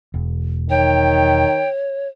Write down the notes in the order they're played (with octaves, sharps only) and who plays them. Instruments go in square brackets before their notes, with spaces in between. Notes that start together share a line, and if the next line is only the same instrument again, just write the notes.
[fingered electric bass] E1
[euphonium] D#3 [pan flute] C#5 [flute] G5